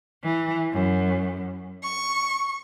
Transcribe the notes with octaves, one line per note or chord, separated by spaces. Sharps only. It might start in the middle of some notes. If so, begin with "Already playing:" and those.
E3
F#2
C#6